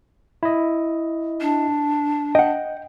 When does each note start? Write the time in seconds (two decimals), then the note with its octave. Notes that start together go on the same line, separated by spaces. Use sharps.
0.43 E4 D#5
1.41 D4
2.35 D#5 F#5 G5